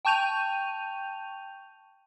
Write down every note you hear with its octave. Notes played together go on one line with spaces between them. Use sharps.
G5 A5 C#6 G6 D#7 F7